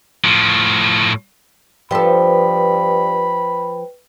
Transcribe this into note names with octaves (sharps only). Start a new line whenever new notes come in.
A2 F3
G2 F3 A4 B4 G5 B5